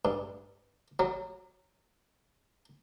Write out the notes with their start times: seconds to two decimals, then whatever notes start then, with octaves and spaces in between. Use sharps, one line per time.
0.05 G2
0.99 F#3